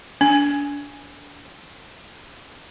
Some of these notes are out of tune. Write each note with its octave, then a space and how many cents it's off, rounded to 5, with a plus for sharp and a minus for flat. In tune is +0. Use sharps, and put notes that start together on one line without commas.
D4 -30